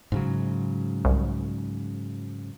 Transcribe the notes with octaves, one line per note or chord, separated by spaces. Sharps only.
G#2 C#3 F#3
C2